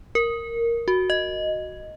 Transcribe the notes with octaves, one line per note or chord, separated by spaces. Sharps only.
A#4
F#4
D#5